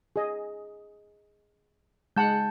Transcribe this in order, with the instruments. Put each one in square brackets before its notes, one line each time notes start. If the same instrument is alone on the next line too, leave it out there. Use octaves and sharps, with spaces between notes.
[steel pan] G#4 D#5
[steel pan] G#3 F#5 [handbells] A5 G6